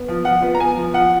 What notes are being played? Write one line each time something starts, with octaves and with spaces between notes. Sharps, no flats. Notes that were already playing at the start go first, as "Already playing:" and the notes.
Already playing: B3
F3
F3 F#5
B3
A#5
B3 G#5
F3
F3 F#5